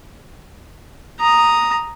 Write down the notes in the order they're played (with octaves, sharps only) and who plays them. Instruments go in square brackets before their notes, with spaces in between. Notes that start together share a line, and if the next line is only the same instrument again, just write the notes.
[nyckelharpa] A#5 D#6